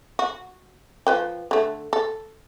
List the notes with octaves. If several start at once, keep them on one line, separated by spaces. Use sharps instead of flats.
F#4
F3 B4 G5
D3 A3
A4